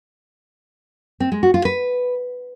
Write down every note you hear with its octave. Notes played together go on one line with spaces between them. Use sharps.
C4
G#3
F#4
F4
B4